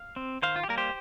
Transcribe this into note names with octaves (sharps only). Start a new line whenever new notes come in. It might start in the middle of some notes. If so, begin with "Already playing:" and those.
Already playing: F5
C4
D#3 C5 F5
F4
G4
G3 A#3 A#4
G4 C5